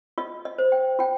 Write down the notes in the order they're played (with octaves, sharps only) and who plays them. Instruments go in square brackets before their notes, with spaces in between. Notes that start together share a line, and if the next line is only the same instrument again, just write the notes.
[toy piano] F4 D#5
D#5
C5
G5
F4 G5